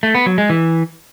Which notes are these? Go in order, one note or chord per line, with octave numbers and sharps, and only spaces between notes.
A3
B3
F#3
G#3
E3